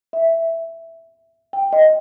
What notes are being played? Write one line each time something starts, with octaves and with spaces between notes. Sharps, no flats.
E5
G5
D#5